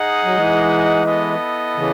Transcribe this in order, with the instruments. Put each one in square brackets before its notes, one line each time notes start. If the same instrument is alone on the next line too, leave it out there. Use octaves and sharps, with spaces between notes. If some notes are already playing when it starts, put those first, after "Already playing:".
Already playing: [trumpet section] D#4 G#4 D#5 F#5
[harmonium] F#3
E3 G#3
[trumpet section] B3 E4 A4 D#5
[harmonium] C#3 E3